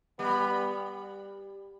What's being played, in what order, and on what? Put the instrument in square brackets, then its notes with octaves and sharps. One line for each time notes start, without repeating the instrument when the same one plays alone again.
[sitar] G3 [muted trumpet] B3